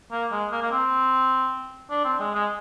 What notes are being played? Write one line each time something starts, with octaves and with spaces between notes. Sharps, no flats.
A#3
G#3
A#3
A#3
C4
D4
C4
G#3
G#3